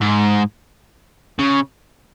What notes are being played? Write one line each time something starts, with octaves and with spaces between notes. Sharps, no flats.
G#2
C#3